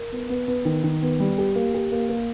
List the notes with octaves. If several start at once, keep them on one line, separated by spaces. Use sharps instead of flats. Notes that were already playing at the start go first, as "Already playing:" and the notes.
Already playing: A#4
B3
B3
B3
D#3
D#3
B3
G3
G4
A#3
G4
A#3
A#3